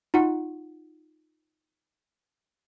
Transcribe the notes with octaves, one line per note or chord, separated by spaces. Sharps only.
D#4 F4 F#4 F#5